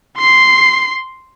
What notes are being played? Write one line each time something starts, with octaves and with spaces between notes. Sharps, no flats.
C6 C7